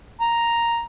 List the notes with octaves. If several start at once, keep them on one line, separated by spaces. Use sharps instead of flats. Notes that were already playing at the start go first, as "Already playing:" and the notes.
A#5